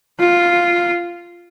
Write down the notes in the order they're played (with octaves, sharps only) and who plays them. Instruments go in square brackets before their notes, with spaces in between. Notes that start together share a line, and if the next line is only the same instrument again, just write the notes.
[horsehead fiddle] F4